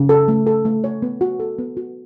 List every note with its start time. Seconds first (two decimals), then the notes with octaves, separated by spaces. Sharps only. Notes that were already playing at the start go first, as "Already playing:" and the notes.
Already playing: C#3
0.09 A4
0.28 A3
0.47 A4
0.65 A3
0.84 C#5
1.02 B3
1.21 F#4
1.40 A4
1.59 B3
1.77 F#4